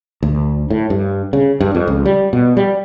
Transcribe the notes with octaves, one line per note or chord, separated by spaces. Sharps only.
D2
A2
G2
C#3
G2
F2
C#2
G3
B2
G3